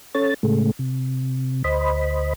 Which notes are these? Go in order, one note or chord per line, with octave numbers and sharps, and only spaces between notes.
C#4 A4 C#5 A6
A2 C#3 G#3 A3
C3
D2 C5 D#5 B5